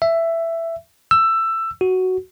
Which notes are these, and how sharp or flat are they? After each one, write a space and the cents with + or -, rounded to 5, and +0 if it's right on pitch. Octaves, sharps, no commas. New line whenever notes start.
E5 +10
E6 +15
F#4 +5